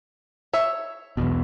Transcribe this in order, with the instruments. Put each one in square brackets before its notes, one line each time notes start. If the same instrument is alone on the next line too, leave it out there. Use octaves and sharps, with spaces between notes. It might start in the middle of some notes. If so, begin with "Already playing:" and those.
[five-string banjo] C#5 E5
[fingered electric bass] B1 E2 B2